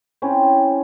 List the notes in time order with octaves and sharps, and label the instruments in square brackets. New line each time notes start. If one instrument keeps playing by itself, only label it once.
[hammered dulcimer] C4 C#4 E4